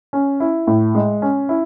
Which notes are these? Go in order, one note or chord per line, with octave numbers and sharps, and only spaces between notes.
C#4
E4
A2
G#3
C#4
E4